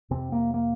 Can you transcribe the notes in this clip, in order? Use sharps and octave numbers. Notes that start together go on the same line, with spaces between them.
F2 C3 C4
A#3
A#3